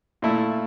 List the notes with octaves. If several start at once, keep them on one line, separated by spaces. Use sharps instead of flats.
A#2 A3 E4